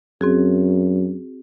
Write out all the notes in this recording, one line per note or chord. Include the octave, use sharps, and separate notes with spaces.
F#2 C4 F#4 G#4